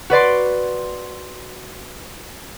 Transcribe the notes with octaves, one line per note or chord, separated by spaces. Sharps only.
F#4 B4 D5 C6